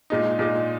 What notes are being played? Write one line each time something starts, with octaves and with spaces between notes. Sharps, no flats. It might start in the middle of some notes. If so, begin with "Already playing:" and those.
A#2 G#3 D#4
A#2 G#3 D#4